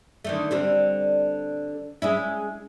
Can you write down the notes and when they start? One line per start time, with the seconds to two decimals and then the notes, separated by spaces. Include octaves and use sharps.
0.24 D3 D#3 A3
0.51 D3 G3 C4
2.02 G#3 C#4 E4